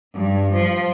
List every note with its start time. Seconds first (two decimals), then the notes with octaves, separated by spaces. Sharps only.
0.14 G2
0.52 F3